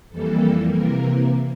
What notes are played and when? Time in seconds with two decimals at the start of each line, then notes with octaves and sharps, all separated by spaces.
0.10 F2 E3 G3 A#3 A4
0.69 C3 E3 A#3 A#4